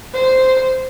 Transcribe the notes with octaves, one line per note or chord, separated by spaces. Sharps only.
C5